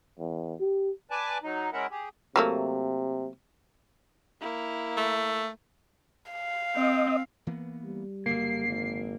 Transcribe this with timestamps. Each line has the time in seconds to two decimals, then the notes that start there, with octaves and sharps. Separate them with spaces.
0.19 E2
0.60 G4
1.11 B4 D5 G#5 A5 D6
1.43 F#3 D#4
1.73 G#3 C#4 E4 A#4 E5 F#5
1.91 G4 G#4
2.36 C3 F#3 A3 A#3
4.40 A#3 E4
4.97 A3
6.32 F5
6.76 C4 D#5
7.47 E3 A#3 B3
7.84 G3
8.26 F#1 F#2 D3 A#3 C7
8.67 G#1